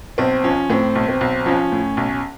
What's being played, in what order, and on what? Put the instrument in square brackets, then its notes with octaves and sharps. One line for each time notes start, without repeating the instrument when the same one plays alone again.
[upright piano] B1 [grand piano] C4
[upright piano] F3 [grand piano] C#4
[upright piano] A2 [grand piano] C4
[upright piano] B1
[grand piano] C4
[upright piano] B1
[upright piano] F3 [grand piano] C#4
[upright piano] A2
B1